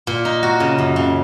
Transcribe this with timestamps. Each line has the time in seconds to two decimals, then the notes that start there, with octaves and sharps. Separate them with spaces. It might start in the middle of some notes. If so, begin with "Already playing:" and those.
0.07 A#2
0.25 D#4
0.43 F#4
0.60 C#3
0.78 F#2
0.96 C#3